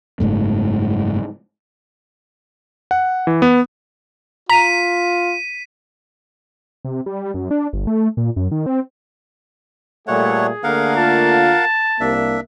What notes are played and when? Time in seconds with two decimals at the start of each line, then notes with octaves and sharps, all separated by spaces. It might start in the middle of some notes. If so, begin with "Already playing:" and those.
0.20 F#1 G#2 A3
2.91 F#5
3.27 E3
3.42 B3
4.50 F4 A#5 B6 D#7
6.85 C3
7.06 G3
7.34 F#2
7.51 D4
7.73 G1
7.87 A3
8.17 A#2
8.36 F#2
8.51 D#3
8.66 C4
10.07 A#2 G3 A3 G#4 C#5 F#5
10.64 D3 A3 A#3 A#4 F5 F#5
10.97 F4 A5
12.00 C2 A#3 D4 E5